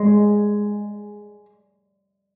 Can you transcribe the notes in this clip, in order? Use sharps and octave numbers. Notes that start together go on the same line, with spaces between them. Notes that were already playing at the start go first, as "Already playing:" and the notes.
Already playing: G#3